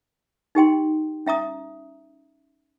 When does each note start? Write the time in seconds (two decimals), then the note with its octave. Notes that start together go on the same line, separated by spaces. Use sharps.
0.55 D#4 G4 G5 C6
1.26 C#4 E5 A#5 D#6